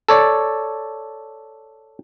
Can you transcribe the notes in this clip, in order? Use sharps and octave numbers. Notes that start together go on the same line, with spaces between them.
A4 C#5 D5